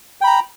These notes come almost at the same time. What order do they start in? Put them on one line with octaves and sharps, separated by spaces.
G5 B5 A#5